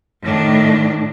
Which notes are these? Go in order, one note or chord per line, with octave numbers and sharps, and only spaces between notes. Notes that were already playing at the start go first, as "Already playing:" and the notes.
A2 D#3 D4